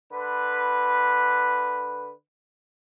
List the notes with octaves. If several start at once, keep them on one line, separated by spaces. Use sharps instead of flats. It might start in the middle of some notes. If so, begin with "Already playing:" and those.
D3 B4